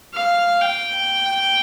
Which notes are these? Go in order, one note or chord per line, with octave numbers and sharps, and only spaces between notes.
F5
G5